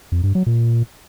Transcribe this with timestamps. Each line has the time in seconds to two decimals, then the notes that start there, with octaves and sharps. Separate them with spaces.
0.12 F2
0.23 G2
0.35 F#3
0.46 A#2